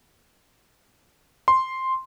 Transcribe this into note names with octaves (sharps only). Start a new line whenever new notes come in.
C6